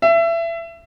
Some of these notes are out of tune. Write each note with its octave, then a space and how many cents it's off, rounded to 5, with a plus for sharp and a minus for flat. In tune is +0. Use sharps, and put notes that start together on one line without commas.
E5 +25